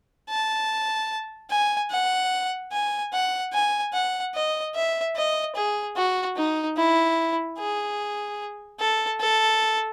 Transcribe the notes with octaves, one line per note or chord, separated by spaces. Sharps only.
A5
G#5
F#5
G#5
F#5
G#5
F#5
D#5
E5
D#5
G#4
F#4
D#4
E4
G#4
A4
A4